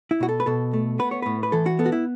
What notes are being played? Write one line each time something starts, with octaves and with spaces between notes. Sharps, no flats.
E4
B2 F#4
A4
B4
B2 A4
A3
B3 B4
C#5
A2 B4
B4
E3 A4
F#4
B3 A4
F#4
E4